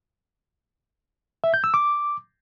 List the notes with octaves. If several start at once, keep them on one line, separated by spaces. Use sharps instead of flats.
E5
G6
E6
D6